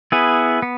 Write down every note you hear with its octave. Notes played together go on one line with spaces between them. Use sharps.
B3 E4 G#4 B4
B3